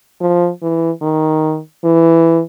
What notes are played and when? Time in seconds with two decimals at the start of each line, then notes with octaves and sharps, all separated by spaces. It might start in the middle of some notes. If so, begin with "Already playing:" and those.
0.21 F3
0.62 E3
1.02 D#3
1.84 E3